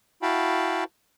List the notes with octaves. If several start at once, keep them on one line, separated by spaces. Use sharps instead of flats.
E4 F#4 F5 G5 A5 B5